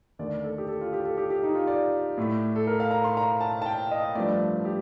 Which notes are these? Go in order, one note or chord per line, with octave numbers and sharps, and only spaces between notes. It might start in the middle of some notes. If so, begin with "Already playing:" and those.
D#2 D3 A3 D5
A4
G4
A4
F4
G4
A4
G4
G4
D#4
F4
D5
A2 A3
A4
A#4
F5
A#5
C6
A#5
A5
A5
G5
D#5
G2 F3 A3 D5
G4